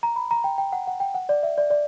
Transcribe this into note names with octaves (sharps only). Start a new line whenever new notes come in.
A#5
B5
A#5
G5
G5
F#5
F#5
G5
F#5
D5
E5
D5
D5